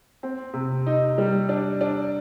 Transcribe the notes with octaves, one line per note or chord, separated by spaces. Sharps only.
C4
C3
D#4
G3
D4
D4